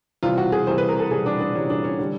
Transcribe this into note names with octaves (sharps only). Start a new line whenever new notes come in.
C3 E3 G3 F4
F#4
G#4
C3 E3 G3 C5
B4
A#4
A4
C3 E3 G3 G#4
D4
D4
C3 E3 G3 C#4
D4
C#4
D3 G3